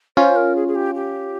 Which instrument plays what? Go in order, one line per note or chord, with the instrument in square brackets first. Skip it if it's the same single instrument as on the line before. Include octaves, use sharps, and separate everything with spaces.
[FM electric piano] C#4 F4 [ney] C5
[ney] A#4
G#4
G#4
G4
G4